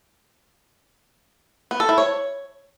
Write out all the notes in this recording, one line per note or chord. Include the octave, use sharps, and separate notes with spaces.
B3
A4
E4
C#5